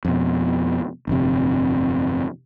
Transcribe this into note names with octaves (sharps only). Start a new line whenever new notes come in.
F2 B2
G1 F2 C3